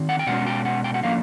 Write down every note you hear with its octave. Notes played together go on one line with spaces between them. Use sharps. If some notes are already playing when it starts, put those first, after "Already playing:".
Already playing: D#3 C4
F#5
G5
B2 G#3 C#4 F#5
G5
F#5
G5
F#5
A2 F3 A#3 C#4 F5